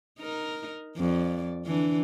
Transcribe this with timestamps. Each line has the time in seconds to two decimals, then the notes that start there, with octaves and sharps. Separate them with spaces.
0.19 D#4 A#4
0.97 F2 D5
1.65 D3 E3 D4